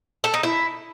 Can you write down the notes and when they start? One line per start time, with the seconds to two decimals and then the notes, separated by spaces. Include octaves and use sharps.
0.24 A4
0.34 D#4
0.43 E4